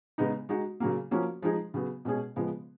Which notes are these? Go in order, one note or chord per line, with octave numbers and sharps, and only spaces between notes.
C#3 G#3 B3 D#4
G#3 D#4 F#4
C#3 F#3 A#3
F3 A#3 C#4 F#4
F3 G#3 D#4 G#4
C#3 F#3 B3
B2 G#3 C#4 G#4
C#3 F3 G#3 B3